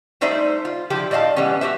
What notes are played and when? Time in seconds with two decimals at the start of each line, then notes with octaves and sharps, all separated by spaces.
0.21 G3 A3 D#4 C5 D5 E5
0.65 F4
0.90 D3 F3 E4 G4
1.11 A2 D5 D#5 F5 A5
1.36 E3 G3 B3 C#4
1.61 F#4 G4 C5 E5